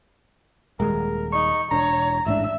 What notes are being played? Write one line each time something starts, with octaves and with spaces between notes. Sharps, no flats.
D#1 G#3 A#4
D#4 C#6
E1 D4 C#5 A#5
A1 G#2 D4 E5